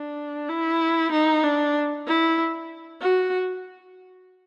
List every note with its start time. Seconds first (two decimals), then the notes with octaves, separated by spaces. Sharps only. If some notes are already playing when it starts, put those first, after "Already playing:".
Already playing: D4
0.49 E4
1.12 D#4
1.43 D4
2.07 E4
3.01 F#4